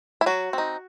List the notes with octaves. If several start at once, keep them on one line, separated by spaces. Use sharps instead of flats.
E4
F#3 F#4
C4 D#4